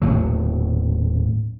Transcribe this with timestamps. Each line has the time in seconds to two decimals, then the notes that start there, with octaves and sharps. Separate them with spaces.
0.02 D#1 C#2 A2 F#3